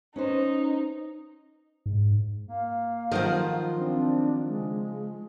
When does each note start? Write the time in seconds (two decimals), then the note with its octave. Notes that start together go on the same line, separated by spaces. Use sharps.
0.16 C#4 D#4 B4 C5
1.86 G#2
2.48 A#3 F5
3.12 D#3 F3 F#3 F4 C5 F#5
3.78 C4 D4
4.48 C#3 G#3